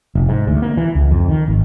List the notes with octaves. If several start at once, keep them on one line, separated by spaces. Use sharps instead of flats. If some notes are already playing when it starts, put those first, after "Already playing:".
F1
G#2
D2
A#3
E3
C#2
F2
D#3
G#1